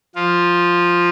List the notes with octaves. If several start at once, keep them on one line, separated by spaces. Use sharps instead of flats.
F3 F4